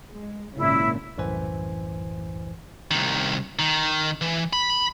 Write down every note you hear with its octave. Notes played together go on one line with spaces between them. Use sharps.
G#3
G#1 A#2 C#3 E4
C2 F#2 A2 E3 C5 G#5
C2 D#3
D#3
E3
B5